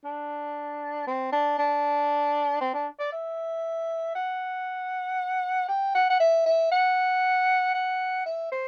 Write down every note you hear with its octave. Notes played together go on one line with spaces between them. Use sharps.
D4
C4
D4
D4
C4
D4
D5
E5
F#5
G5
F#5
F#5
E5
E5
F#5
F#5
E5
C5